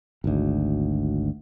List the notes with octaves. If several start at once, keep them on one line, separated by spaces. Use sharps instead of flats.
G#1 D2